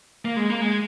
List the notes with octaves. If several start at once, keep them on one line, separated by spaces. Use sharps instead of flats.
A#3
G#3
A#3
G#3